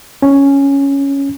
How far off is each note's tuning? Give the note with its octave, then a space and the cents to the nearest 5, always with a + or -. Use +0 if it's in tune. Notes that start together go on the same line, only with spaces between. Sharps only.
C#4 +0